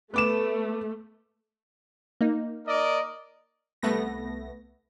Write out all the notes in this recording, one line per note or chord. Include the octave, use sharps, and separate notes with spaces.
A3 B3 D6 E7
A#3 D#4
A#4 D5 D#5
C2 A3 B3 A#6